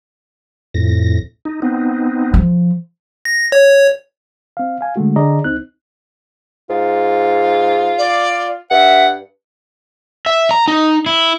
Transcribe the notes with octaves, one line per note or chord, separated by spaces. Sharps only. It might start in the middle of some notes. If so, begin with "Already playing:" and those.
F2 A2 A#6
D#4
B3 C4 D#4
F3
A#6
C#5
C4 F5
F5 G#5
D3 G#3 A3 F#4
D3 G#4 D5 D#5 A#5
C#2 C4 D#4 F#6
G#2 F4
D5
G2 E5 F#5
E5
A#5
D#4
E4